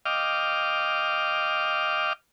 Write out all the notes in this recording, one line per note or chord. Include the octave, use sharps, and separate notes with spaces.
D#5 F5 G5 D6 F6